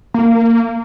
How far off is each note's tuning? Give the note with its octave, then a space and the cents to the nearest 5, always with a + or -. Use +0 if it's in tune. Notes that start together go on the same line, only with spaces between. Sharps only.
A#3 -20